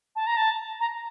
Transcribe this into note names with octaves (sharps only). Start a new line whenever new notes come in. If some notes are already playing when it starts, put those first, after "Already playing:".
A5
A#5
A5
A#5